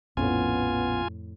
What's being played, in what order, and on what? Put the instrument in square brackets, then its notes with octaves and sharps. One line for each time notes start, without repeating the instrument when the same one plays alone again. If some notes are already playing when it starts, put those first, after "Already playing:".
[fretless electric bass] A#1 C#4 [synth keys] F2 A2 [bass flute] B3 [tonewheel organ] F4 G#5